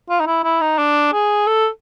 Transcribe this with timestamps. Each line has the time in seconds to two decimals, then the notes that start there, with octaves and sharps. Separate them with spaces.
0.10 F4
0.20 D#4
0.27 E4
0.44 E4
0.61 D#4
0.78 D4
1.13 G#4
1.47 A4